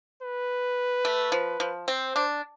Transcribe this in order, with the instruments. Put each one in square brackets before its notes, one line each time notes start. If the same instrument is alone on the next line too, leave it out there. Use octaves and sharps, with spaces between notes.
[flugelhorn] B4
[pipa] A3
F3
F3
[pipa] C4 [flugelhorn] C5
[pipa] D4